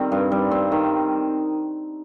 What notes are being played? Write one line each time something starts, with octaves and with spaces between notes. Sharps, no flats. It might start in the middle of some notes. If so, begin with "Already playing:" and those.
Already playing: D#3 G3 C4
G2
G3
C4
D#3